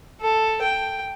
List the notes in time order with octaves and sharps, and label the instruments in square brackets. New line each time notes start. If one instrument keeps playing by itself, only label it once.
[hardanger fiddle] A4
G5